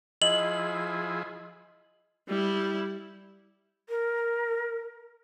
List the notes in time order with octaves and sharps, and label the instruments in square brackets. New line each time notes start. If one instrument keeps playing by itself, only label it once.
[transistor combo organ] F3 E4 G#4 [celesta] D#5 [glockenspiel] F#7
[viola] G3 E4
[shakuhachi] A#4